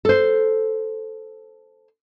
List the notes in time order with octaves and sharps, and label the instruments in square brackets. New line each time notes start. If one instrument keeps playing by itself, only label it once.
[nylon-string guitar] A4 C5